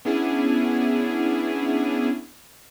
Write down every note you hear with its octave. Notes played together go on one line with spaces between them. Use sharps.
B3 C#4 D4 E4 G#4